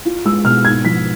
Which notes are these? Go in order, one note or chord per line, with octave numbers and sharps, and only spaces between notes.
F4
G#3 E6
B2 F6
G#2 G#6
F3 B6